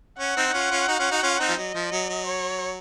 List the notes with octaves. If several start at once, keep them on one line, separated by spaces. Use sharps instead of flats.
C#4 F#5
C4 D#4
D#4
C#4 F4
C#4 F4
D#4 F#4
C#4 F4
D#4 F#4
C#4 F4
C4 D#4
F3
F#3 D#5
F3
F#3
F#3
C#5